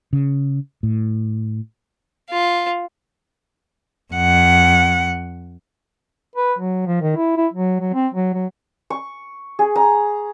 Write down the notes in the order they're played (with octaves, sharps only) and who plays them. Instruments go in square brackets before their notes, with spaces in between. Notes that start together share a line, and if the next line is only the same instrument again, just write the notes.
[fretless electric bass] C#3
A2
[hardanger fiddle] F4
[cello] F2 F#5
[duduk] B4
F#3
F3
D#3
E4
E4
F#3
F#3
C4
F#3
F#3
[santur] C#6
G#4
A#5